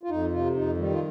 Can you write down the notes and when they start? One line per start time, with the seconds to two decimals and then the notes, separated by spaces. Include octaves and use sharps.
0.03 F4
0.10 F2 D#4
0.32 C3 F4
0.54 F2 D#4
0.77 D#3 G3
0.92 F4